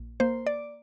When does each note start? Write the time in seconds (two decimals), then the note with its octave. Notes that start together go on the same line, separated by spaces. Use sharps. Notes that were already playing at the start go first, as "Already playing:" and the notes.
Already playing: A#1
0.20 A#3 C5
0.47 D5